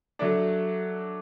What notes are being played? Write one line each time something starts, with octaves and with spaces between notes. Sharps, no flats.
F#3 A3 D4